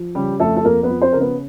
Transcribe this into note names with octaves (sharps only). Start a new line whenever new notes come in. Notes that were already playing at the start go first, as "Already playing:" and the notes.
Already playing: F3
C#3 G3 G4
F2 A3 A4
A4
F2 A#3 A#4
B3 B4
F3
C4 C5
C#3 A#4
B3 B4